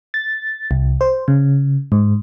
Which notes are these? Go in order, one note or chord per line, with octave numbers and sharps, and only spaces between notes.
A6
C2
C5
C#3
G#2